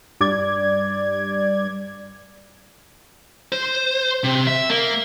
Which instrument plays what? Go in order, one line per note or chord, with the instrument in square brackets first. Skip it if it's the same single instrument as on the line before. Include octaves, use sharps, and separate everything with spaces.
[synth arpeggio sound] G2 D5 G#6
[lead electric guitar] C5
C3
E5
A#3